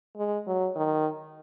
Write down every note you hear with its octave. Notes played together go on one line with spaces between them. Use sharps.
G#3
F#3
D#3